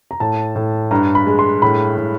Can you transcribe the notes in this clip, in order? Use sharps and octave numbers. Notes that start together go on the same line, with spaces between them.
A#5
A2 A5
A2
G2 A#5
B5
G#3
C6
A2 B5
A2